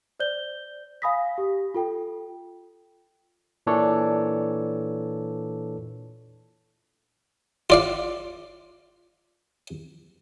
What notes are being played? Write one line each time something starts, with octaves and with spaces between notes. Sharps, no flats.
C5 D5 G6 G7
F5 G#5 B5 D#6 A#6 B6
G4
F4 A4 G5
A#2 E3 D4 A4 C#5 D5
F4 D5 F5